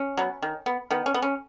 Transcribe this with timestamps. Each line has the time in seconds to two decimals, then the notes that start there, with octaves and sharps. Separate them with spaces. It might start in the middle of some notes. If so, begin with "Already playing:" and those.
Already playing: C#4
0.17 F#3 B3
0.42 D#3
0.66 B3
0.90 D#3 B3
1.06 C#4
1.14 B3
1.22 C#4